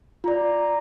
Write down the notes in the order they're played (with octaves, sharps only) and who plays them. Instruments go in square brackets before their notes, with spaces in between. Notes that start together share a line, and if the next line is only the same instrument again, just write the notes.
[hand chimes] F4 D5 [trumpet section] A#5